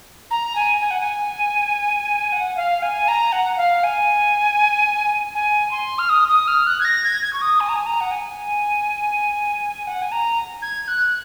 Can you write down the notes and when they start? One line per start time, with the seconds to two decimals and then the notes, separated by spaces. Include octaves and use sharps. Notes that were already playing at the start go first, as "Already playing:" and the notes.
0.31 A#5
0.55 G#5
0.80 G#5
0.91 F#5
1.00 G#5
2.32 F#5
2.57 F5
2.82 G#5
3.08 A#5
3.32 F#5
3.58 F5
3.83 G#5
5.35 G#5
5.71 C6
5.98 F6
6.09 D#6
6.28 D#6
6.47 F6
6.67 F#6
6.80 G#6
6.84 A#6
7.04 G#6
7.22 G#6
7.33 C#6
7.41 D#6
7.60 G#5
7.69 A#5
7.76 G#5
7.86 A#5
8.00 F#5
8.11 G#5
9.87 F#5
10.02 G#5
10.12 A#5
10.62 G#6
10.88 F#6